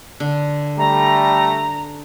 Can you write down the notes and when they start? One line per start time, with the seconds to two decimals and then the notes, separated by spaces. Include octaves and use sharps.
0.20 D3
0.78 G3 A3 A#5